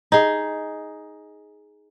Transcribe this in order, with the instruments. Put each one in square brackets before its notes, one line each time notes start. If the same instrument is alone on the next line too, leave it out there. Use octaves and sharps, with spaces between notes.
[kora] D#4 G#4